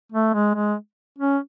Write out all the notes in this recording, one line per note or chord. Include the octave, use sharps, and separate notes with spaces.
A3
G#3
G#3
C#4